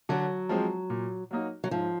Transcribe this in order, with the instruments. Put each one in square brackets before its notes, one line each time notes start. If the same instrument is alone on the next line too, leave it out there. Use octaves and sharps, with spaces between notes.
[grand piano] D3 [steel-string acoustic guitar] F#3
[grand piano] F3 G#3 C4
A#2
F#3 A#3 D#4 F#4
[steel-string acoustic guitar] F#3
[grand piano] G#2 [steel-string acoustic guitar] F3